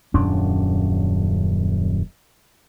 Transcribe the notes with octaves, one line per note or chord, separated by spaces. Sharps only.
D#1 F#2 C#4 D4